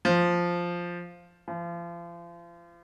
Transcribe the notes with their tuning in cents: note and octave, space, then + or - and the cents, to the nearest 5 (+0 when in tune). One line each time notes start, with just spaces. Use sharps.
F3 +0
F3 -35